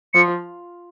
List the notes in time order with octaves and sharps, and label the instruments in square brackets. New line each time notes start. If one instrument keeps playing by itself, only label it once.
[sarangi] F3 [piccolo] C#7